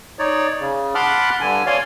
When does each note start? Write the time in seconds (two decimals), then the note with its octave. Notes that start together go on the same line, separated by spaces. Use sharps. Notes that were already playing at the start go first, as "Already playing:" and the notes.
0.19 D#4 C#5 D5
0.61 C#3
0.95 F#5 A5 B5 C6 D6 F6
1.41 G2 D3 G#5
1.67 C#5 D5 F5 G#5 C6